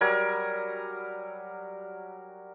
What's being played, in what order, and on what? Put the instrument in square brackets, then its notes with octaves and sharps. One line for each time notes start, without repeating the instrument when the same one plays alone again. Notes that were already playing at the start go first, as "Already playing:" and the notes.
[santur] F#3 G3 A#4 G#5